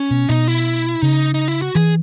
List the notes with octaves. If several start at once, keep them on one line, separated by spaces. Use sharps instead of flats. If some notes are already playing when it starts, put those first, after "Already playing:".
Already playing: C#4
B2
B2 D#4
E4
C#3 D#4
D#4
E4
F#4
E3 G#4